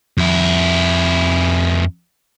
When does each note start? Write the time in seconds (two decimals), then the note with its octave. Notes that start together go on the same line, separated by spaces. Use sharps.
0.18 F2 E4